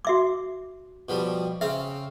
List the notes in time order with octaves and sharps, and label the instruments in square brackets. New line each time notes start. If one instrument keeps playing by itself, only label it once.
[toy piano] F#4 E5 D6
[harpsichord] B2 F3 G3
[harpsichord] C#3 C4 F5 [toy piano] E5